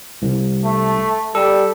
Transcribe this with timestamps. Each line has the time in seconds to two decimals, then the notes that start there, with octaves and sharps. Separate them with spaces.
0.22 C2
0.65 A3
1.35 G3 A4